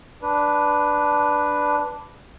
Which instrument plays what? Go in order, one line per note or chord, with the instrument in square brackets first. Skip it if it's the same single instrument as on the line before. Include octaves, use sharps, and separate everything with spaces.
[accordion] D4 B4